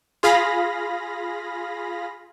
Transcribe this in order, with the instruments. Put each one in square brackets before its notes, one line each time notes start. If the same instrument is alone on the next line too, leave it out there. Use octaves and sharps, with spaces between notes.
[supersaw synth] F4 G#4 F5 B5 A#6